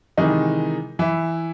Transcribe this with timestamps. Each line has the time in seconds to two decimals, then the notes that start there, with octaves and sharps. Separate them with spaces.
0.17 C3 D#3 E3 G#3 D#4
0.99 E3 E4